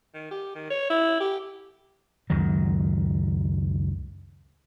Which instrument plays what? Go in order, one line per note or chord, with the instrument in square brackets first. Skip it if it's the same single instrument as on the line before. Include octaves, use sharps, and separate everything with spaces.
[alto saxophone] D#3
G4
D#3
C#5
E4
G4
[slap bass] C#2 F#2 D#3 F#3